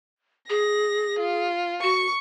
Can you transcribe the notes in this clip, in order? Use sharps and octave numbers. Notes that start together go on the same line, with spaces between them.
G#4 A#6
F4
F#4 C#6 C#7